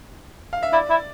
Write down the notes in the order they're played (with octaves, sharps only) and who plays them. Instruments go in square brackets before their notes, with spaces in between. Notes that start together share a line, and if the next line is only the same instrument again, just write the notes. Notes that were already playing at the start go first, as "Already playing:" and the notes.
[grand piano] F5
E5
[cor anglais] E4 [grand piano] D5
[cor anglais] E4